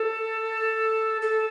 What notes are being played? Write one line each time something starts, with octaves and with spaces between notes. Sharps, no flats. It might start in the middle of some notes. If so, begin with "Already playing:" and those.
Already playing: A4
A4